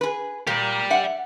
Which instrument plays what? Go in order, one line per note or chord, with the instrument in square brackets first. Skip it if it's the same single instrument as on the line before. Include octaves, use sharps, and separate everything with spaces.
[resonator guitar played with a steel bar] G#4 B4
[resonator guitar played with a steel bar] A#2 A#3 [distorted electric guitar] G4 D5
[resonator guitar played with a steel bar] E5 F#5